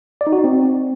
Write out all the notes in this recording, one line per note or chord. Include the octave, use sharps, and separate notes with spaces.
D5
D#4
F#4
D#4
C4